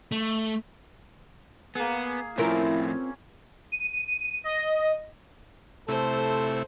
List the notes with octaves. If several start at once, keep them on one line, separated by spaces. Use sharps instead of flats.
A3
A#3 B3 G#4
A2 F3 C4 C#4 E4 F4 A#4
D#7
D#5
C3 A3 E4 A4 C5